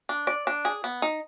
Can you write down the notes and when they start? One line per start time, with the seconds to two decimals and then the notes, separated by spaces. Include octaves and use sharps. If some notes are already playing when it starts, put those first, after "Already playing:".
0.09 D4
0.27 D5
0.47 D4
0.65 G#4
0.84 B3
1.02 D#4